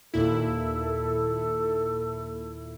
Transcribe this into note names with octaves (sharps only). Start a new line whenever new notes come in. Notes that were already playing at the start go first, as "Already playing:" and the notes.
D#2 A#2 E4 A4